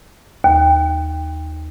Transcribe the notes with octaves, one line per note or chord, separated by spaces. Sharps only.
D#2